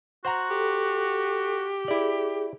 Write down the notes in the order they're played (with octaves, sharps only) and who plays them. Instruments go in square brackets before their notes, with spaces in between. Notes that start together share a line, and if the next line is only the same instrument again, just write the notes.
[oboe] F#4 [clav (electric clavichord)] C5 F#5 A#5
[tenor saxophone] G4 [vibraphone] A4
[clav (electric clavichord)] E4 D5 [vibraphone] G#4